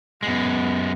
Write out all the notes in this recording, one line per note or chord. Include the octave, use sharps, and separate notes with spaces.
F#2 G#3 B3